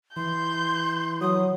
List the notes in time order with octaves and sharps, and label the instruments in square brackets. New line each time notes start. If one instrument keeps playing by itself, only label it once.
[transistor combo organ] E3 [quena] C6 [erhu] G6
[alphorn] F#3 [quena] D#6